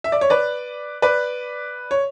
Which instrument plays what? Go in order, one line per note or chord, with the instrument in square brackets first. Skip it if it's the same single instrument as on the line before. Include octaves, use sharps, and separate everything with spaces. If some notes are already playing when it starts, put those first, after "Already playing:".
[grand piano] E5
D5
C#5
B4 D5
B4 D5
C#5